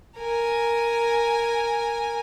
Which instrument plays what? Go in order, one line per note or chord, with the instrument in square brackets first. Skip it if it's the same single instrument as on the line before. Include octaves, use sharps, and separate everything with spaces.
[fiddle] A#4 G#5